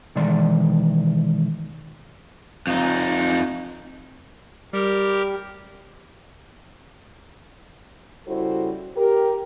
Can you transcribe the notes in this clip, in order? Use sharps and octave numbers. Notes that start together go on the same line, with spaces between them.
B2 D#3 E3 G#3 D5 C6
F2 D#4
G3 G4 A#4
C#3 G3 E4 F#4 A4 C5
G4 A#4